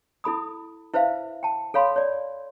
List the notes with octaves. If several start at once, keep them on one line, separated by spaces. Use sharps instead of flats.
E4 A4 B5 D#6
E4 B4 C5 E5 F5
G5 A5
A4 C#5 F5 B5 C6
C#5 D5